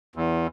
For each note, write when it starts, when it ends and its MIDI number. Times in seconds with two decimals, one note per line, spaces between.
0.16 0.47 40